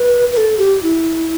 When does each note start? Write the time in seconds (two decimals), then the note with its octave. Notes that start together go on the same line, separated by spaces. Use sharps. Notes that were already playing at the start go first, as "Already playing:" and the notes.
Already playing: B4
0.32 B4
0.37 A4
0.58 G4
0.83 E4